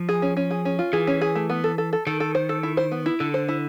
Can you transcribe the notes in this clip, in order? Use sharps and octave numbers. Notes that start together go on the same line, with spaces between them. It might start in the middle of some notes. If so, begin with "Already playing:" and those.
Already playing: F3
G#4
C#4
C#4
G#4
C#4
F4
E3 G#4
C#4
G#4
A3
B3
A4
A4
A4
D#3 A4
A4
C5
A4
E4
C5
B3
E4
D3 A4
C5
E4